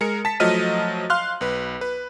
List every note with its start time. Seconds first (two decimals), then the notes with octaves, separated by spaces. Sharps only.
0.01 G#3 A#4 C#7
0.25 A5 B6
0.40 F3 F#3 A3 D#5 F6 D#7
1.10 F5 C6 F6 F#6
1.41 B1 B4
1.81 B4